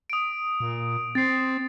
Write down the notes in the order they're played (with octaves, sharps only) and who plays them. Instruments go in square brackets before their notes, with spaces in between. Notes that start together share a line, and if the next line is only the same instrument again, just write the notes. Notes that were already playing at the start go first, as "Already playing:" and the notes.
[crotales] D#6 D7
[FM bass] A#2
[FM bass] C4 [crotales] A6 C7